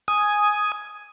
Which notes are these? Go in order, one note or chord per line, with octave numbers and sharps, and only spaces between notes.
G#5 D#6